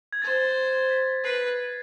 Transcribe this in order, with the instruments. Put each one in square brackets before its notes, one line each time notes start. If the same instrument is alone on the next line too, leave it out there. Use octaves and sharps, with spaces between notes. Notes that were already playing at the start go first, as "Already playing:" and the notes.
[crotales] G#6
[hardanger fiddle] C5 [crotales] A6
[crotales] B6
[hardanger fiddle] B4 [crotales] C7